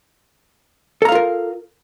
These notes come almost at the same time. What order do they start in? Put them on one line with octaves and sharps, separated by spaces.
A4 A#5 F5 F4 A#4